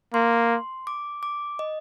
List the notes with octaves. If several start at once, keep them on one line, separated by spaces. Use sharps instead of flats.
A#3 C6
D6
D6
D#5